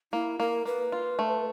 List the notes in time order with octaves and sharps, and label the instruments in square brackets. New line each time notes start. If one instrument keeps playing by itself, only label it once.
[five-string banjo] A#3 [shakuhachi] E4
[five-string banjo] A#3 [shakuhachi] A#4
[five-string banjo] A#3 [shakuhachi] B4
[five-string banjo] F4
A3